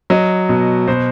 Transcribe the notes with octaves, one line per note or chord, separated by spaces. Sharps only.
F#3 D#5
B2
B2 C5